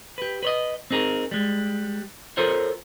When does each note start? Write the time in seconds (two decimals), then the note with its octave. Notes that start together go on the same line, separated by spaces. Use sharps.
0.18 G4 B4
0.43 B4 C#5 D#5
0.91 C4 D#4 G#4 A#4
1.31 G3 G#3
2.37 F4 A4 A#4 C5 C#5